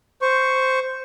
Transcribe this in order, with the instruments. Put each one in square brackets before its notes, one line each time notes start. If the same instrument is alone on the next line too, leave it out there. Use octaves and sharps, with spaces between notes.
[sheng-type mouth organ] C5 C#6